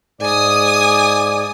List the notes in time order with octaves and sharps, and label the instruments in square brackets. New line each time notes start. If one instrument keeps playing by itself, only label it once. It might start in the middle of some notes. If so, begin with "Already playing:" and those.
[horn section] G#2 D5 [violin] G#5 D#6